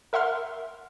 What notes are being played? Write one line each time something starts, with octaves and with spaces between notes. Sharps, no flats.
A#4 E5 F#5 C6 F6